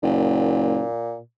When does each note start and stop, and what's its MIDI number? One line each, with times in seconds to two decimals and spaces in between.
0.03 0.84 30
0.03 1.19 46